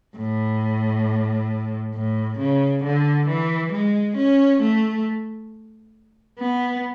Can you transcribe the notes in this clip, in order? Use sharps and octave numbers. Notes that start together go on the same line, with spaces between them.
A2
A2
C#3
D3
E3
G#3
C#4
A3
B3